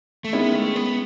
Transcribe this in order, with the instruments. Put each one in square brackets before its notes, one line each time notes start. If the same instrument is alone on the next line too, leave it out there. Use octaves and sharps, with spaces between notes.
[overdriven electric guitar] A3
[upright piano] D#3 G#3 C#4 E4 [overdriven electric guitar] B3
[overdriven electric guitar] A3
B3